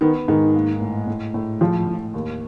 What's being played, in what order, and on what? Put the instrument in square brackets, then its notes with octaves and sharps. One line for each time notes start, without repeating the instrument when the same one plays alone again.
[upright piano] D#3 [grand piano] B3
[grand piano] G#2 [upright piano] D#3
[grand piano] A#3
A2
A2
A2
[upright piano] F3 [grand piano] G#3
[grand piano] A2
D#2